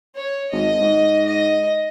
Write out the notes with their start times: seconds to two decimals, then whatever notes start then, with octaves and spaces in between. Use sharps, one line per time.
0.15 C#5
0.52 G#1 D#5
0.81 G#2
1.26 D#5